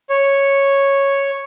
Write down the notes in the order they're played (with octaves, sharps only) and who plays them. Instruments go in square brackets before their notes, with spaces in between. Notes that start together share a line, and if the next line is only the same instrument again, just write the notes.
[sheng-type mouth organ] C#5